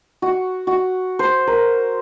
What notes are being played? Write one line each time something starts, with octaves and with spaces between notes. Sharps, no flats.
F#4
F#4
C5
A#4